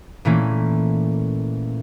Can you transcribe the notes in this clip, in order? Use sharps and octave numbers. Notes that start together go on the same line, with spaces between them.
A#2 E3 A3 A#3 C#4